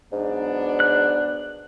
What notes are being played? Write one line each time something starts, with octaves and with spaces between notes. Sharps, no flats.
G#2 F#3 B3 D4
F#6